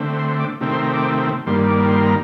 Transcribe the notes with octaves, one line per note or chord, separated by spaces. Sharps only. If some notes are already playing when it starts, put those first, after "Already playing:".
Already playing: D3 A3 C4
C6
D6
C3 D#3 A3 C4
C6
A#5
D6
G2 D#3 G3 A#3 C6
D6
C6
A#5